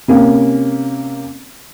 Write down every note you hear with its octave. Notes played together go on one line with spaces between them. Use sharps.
C3 A#3 C#4